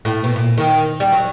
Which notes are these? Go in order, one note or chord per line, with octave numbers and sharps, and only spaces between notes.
A2
B2
A#2
D#3
G3
F#3